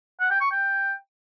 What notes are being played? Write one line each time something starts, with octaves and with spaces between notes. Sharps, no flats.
F#5
G5
C#6
G5